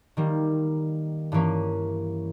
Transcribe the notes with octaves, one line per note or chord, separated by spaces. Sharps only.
D#3 G3 A#3
G2 E3 A#3 C#4